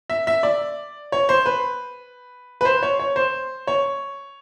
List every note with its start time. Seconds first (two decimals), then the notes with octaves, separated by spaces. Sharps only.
0.10 E5
0.27 E5
0.43 D5
1.12 C#5
1.29 C5
1.46 B4
2.61 B4
2.65 C5
2.83 C#5
3.00 C#5
3.16 C5
3.67 C#5